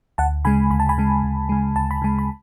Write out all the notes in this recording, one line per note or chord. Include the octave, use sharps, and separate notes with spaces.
D2 F#5 A5
C#3 G#3 G#5 B5
D2 B5
A5
G#5 B5
C#3 G#3
D2
C#3 G#3
D2 A5
B5
C#3 G#3 A5
B5